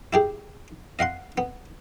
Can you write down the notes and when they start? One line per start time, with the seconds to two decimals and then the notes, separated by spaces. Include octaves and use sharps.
0.13 E4 G4 G#4
0.99 D#5 F5 F#5 C6
1.38 B3